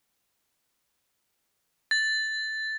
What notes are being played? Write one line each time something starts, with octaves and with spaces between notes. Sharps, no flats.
A6